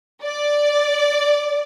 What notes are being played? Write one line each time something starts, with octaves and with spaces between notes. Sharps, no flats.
D5